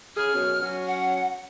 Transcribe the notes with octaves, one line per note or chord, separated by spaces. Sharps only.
C#3 G#4 F6
F#2 B2 C#4
F#3 C#4
F#5